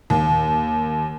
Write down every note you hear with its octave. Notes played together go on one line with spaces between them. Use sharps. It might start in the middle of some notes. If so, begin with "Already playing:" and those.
D#2